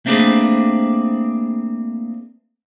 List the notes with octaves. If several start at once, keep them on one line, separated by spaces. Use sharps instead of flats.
A3 A#3 C4 D4 G#4 B4